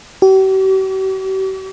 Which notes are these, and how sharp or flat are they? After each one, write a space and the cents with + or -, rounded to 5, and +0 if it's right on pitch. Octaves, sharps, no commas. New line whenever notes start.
G4 -45